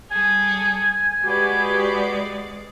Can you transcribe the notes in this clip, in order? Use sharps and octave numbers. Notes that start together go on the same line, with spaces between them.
G3 G#4 A4 G#5
G#3 F#4 G4 B4 D5